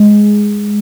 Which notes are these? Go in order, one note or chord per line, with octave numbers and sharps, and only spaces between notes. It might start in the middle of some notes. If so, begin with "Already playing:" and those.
Already playing: G#3